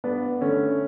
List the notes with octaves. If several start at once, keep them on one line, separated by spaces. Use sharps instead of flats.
G2 B3 D4
D3 A3 C#4